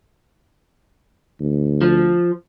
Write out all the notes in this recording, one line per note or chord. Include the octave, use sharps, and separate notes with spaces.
D2
F3